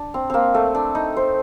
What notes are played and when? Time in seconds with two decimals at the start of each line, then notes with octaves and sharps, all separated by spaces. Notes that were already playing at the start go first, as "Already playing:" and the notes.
Already playing: D4
0.14 C4
0.30 A#3 C4
0.54 A3
0.75 D4
0.95 D#4
1.17 C5